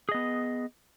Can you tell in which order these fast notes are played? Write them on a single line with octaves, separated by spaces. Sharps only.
G#4 D#5 B3